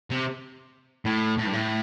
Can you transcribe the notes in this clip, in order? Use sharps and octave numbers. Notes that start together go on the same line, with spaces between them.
C3
A2
A2
G2
A2